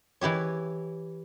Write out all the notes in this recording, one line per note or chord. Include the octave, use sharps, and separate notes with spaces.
E3 E4 G4 C#5